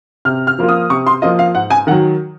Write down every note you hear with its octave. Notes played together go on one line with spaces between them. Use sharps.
C3 F6
F6
F3 A#3 F4
D#6
C3 C#6
C6
F3 A#3 F4 D#5
F5
G#2 F#5
G#5
D#3 F#3 F#5